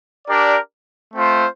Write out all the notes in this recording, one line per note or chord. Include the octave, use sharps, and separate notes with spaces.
D4 G4 A#4 D5
A3 C4 F4 C5